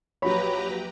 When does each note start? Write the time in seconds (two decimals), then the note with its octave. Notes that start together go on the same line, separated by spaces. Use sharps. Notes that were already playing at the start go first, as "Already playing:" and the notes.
0.22 A#1 F#3 G4 B4 C#5 A#5 B5